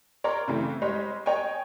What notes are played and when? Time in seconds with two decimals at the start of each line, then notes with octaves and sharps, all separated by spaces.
0.24 A#4 C#5 D5 A#5 C6
0.48 C#3 E3 A3 C4
0.82 G3 G#3 C5 C#5
1.26 C#5 D#5 G5 G#5